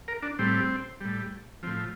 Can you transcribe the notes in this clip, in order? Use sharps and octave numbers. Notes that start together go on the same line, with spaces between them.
A#4
D4
A2 G3 C4
A2 G3
A2 F3 C4